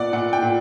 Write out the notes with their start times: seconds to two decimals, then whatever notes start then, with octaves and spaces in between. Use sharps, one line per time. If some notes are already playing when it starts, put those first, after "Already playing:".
Already playing: A#2 B3 D5 F#5
0.13 A#2 F#5
0.33 G5
0.42 A#2